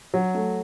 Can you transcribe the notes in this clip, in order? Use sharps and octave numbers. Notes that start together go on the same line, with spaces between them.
F#3
A3